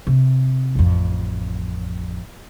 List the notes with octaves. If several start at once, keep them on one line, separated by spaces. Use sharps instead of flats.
C3
A1 F2